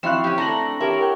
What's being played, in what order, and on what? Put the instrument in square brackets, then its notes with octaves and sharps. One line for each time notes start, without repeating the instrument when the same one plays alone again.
[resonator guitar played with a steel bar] F3 F#4 F5 [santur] C4 E4 C#6 [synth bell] F#6 E7
[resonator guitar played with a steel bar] C#4 G4
[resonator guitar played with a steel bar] A3 D4 A4 [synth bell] A#5 A#6 F#7
[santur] G4 C#5 [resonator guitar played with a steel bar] A4 E5 [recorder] A#4
[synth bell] F#5 G5